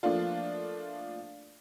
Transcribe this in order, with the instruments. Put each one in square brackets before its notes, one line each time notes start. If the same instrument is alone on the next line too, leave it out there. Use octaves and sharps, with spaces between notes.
[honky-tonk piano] F3 A3 A#3 D4 F4